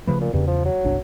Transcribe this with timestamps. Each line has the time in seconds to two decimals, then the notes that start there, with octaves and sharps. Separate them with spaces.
0.07 C#3 F3 A3 B4
0.21 A#2
0.33 E2 G2 C#3
0.47 F3
0.65 F#3
0.84 G1 C2 D4